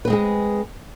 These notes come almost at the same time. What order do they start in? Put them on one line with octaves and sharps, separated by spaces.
B4 C4 G#3 G#4